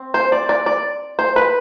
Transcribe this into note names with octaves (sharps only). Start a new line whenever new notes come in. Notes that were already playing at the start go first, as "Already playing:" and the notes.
Already playing: C4
C5
D5
D5
D5
C5
B4